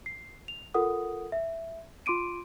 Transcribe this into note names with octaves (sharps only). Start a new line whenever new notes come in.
C7
F7
F4 A4 A#4 F#5 D#6
E5
F4 C6 D6 D7 D#7